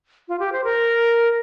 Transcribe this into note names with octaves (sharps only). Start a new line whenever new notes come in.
F4
G4
C5
A#4